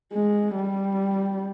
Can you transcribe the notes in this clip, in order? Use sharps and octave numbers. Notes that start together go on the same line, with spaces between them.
G#3
G3